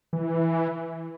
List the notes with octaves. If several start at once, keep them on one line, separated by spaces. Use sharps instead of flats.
E3